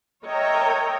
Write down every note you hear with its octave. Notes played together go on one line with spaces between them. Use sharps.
A#4 C#5 D#5 E5 G5 A#5